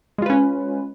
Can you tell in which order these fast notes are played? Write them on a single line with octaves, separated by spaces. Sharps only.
G#3 F4 B4 C#4